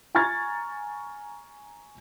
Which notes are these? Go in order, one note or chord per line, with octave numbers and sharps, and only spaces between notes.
G#5 A#5 C#6 F6 G#6 A6